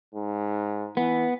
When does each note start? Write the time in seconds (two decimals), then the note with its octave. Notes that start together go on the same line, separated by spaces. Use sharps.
0.14 G#2
0.97 E3 B3